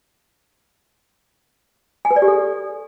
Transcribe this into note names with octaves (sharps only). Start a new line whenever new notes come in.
G#5
B4
D5
G4
A4